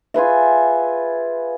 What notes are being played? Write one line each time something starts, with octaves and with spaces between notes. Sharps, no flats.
F4 G#4 B4 E5